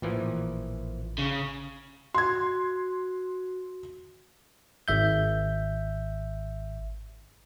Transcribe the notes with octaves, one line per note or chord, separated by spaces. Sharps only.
A1 A#2 E3 F3
C#3
F#4 C6 G#6
G#1 E5 G6